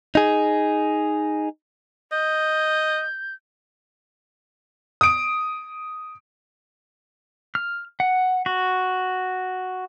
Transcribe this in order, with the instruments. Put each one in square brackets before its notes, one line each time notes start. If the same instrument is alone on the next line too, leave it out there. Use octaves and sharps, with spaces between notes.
[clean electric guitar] D#4 G#4
[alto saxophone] D#5 [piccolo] G6
[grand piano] D#6 D7
[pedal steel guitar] F6
F#5
F#4